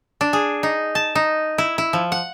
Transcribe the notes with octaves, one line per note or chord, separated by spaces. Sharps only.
D4
G#4
D#4
A5
D#4
E4
E4
F3
F#5